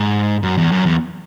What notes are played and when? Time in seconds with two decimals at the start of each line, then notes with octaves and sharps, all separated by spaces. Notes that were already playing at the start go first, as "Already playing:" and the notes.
Already playing: G#2
0.43 F#2
0.58 E2
0.71 F#2
0.86 E2